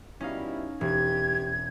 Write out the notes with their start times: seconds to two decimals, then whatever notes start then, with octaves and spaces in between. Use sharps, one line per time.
0.21 B2 G3 C#4 D#4 E4 F5
0.81 E1 G4 G#6